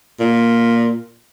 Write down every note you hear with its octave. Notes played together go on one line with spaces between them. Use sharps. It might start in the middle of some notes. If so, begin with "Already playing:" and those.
A#2